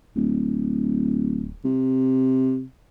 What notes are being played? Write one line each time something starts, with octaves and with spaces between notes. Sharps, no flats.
D1
C3